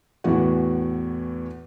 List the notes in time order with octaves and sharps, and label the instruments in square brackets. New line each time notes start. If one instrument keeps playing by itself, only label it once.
[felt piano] E2 A2 E3 F#4